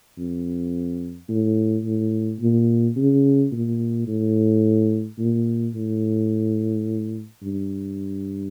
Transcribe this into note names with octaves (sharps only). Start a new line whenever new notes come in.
F2
A2
A2
A#2
C#3
A#2
A2
A#2
A2
G2